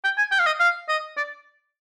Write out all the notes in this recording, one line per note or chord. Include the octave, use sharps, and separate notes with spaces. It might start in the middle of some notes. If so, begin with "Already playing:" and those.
G5
G#5
G5
F5
D#5
F5
D#5
D5